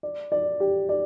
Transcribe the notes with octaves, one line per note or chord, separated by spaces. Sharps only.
D5
D5
G4
D5